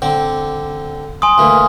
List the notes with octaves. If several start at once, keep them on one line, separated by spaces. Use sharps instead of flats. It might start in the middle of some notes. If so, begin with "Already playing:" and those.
D3 C4 D5
G#5 C6 D#6
D2 E3 A#3